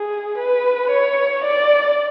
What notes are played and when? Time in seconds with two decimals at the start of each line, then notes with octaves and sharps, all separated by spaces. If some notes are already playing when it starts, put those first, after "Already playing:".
Already playing: G#4
0.38 B4
0.90 C#5
1.44 D5